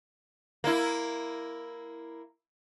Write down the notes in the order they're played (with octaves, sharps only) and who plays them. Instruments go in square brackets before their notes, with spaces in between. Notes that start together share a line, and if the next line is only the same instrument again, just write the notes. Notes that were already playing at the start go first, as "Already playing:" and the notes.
[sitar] A#3 E4